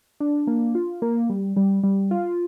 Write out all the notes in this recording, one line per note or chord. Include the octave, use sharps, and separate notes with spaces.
D4
A#3
F4
A#3
G3
G3
G3
F4